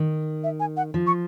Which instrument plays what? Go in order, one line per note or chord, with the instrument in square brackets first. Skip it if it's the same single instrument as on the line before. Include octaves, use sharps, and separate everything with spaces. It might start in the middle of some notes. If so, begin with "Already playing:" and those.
Already playing: [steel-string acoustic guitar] D#3
[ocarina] E5
G#5
F#5
[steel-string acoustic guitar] F3
[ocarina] C#6